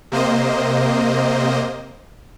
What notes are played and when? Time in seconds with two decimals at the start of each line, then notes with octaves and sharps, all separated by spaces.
0.12 C3 A#3 C5 D#5